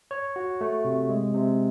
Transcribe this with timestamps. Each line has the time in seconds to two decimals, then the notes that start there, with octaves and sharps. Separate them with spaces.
0.11 C#5
0.36 F#4
0.61 A3
0.85 C3
1.09 G#3
1.34 C3